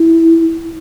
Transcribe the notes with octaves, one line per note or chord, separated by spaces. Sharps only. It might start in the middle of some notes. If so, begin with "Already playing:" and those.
Already playing: E4